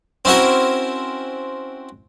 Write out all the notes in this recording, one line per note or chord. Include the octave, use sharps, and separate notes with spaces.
C4 C#4 E4 F#4 A#4